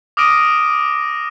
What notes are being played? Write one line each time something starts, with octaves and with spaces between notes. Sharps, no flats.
D6 D#6 F6 A#6 D7 D#7